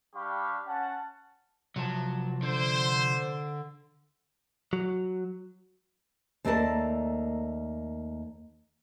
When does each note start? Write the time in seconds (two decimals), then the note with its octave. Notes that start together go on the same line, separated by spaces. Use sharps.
0.15 G3 D4 G4 F5 B5 C#6
0.67 C#4 F#5 A5
1.76 C3 F3 F#3 A5
2.42 D3 C5
4.73 F#3
6.45 D#2 A3 A#3 A#4 D5 A5